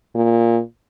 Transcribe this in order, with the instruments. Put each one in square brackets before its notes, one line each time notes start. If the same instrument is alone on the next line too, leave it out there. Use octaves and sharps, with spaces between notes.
[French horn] A#2